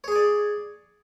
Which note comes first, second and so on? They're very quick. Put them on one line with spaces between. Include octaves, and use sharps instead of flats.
C#5 G#4 G#5 D5